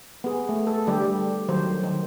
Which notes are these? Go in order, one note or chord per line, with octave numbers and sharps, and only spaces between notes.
B3 G#4
A3
A4
D3 G3 G4
D#3 F#3 C5
D#3